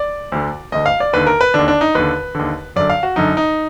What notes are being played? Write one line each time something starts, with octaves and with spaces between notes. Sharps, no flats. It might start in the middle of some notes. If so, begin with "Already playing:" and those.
Already playing: D5
D2 D3
D2 D3 D#5
F5
D5
D#2 D3 B4
A#4
B4
D#2 D3 D4
D4
D#4
D#2 D3 B4
D#2 D3
F#2 D3 D5
F5
F#4
F#2 D3 D#4
D#4